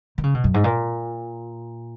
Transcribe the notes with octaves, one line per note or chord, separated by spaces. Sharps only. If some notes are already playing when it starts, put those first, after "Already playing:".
D#3
C#3
B2
F#2
G#2
A#2